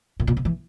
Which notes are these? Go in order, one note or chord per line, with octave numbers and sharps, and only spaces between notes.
A2
A#2
C3
E3